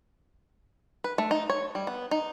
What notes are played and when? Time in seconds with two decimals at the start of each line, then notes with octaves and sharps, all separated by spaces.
1.04 B4
1.18 A3
1.31 D#4
1.50 C#5
1.75 G3
1.87 B3
2.11 D#4